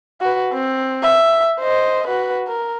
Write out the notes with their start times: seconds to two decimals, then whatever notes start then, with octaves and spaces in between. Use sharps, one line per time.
0.21 F#4 B4
0.53 C4
1.03 E5
1.60 C5 D#5
2.08 F#4 B4
2.47 A#4